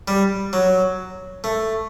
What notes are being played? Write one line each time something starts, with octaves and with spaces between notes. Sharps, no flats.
G3
F#3
A3